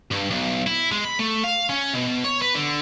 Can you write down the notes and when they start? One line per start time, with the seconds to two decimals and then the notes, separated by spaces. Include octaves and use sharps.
0.12 G2
0.31 B1
0.67 E4
0.92 G#3
1.04 B5
1.19 A3
1.44 F5
1.70 C#4
1.93 B2
2.24 C#5
2.42 B4
2.55 D3